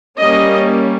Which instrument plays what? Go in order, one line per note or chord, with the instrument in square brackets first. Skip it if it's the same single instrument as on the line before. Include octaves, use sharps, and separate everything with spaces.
[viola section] G3 A#3 C#4 D#5